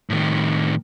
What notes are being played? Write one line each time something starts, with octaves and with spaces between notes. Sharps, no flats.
A2 D#3